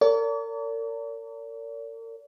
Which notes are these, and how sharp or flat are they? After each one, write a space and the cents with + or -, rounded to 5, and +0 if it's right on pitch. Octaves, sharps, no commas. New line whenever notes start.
A#4 -35 D5 -45